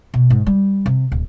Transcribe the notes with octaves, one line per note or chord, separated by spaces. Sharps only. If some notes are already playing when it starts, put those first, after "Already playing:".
B2
G#2
G3
C3
D1